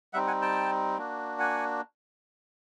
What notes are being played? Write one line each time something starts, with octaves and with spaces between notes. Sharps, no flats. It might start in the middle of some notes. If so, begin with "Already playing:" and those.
G3 C4 D#4 E5 F#5
F#5 G#5
G5 A5
A#3 D4 F#4
F#5 G#5